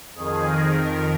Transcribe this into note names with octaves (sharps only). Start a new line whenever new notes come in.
F2 D#3 G#4
A#4
F2 D#3 A#4